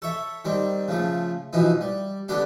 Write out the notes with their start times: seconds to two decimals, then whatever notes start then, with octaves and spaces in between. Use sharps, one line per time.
0.02 A4 C#5 E5
0.45 D#3 G3 C4
0.88 C#3 F3 A3
1.53 B2 E3 F3 D#4
1.81 G3
2.28 D3 G3 B3 D4 G4